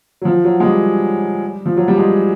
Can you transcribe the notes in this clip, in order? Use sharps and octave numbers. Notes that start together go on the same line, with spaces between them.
F#3
F3
F#3
G#3
G3
F3
F#3
G3
G#3